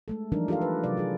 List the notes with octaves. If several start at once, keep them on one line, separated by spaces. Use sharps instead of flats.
G#3 A3 A4
E3 F3 G3 D4 D#4 A#4
F4 G4 A4 A#4 F5
B4
C3 F#3 D5
F4 G#4